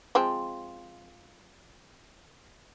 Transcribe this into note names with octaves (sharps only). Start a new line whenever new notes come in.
F3 G#3 C4